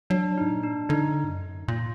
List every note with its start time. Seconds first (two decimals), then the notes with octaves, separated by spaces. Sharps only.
0.10 F#3 D4
0.38 D#4
0.41 G#2
0.50 A#2
0.63 D4
0.89 D3 D#4
1.24 G#2
1.28 F#2
1.68 A#2 F4